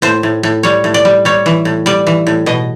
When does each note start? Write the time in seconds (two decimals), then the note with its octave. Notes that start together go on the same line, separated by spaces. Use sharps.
0.02 A2 C5
0.23 A2
0.43 A2
0.63 G3 C#5
0.84 A2
0.94 D5
1.05 G3
1.25 G3 C#5
1.46 E3
1.65 A2
1.86 G3 D5
2.07 E3
2.27 A2
2.46 B2 D#5